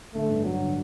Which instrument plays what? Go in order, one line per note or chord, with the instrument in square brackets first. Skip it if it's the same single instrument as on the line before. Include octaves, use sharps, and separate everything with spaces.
[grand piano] D3 [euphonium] A3
[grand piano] G2
[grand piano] G2 [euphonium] F#3
[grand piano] D3